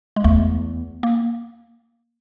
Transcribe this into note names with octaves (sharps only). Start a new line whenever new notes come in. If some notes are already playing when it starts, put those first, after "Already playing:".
G#3
E2 A3
A#3